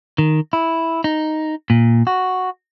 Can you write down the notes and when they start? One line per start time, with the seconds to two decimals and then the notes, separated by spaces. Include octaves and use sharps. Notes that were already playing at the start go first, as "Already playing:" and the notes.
0.18 D#3
0.53 E4
1.04 D#4
1.70 A#2
2.07 F#4